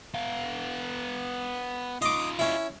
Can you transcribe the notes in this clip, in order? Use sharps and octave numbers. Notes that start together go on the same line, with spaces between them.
B3 F5
D#4 F4 D#5 D6
C#4 E4